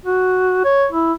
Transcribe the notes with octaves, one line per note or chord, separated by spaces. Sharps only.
F#4
C#5
E4